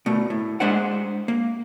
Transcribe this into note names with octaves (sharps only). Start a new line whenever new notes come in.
B2 A3
A2
G#3 D4 C5 F#5
A#3